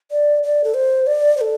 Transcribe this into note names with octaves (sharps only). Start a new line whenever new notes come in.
D5
D5
A4
C5
D5
C5
A4